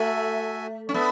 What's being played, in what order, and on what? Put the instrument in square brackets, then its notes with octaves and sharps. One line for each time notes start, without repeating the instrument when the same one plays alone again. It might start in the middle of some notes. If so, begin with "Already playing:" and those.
Already playing: [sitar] A3 [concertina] F#4 A4 E5 G#5
[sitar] C#4
[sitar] B3 [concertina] D4 A4 E5